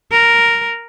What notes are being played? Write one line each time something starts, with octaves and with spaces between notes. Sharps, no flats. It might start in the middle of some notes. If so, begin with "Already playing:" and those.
A#4